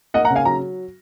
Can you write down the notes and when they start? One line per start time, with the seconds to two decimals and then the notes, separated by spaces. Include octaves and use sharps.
0.14 A#3 D#5 F#5
0.25 F#5 A#5
0.30 C#3
0.35 F5 G#5
0.45 F#3 A#5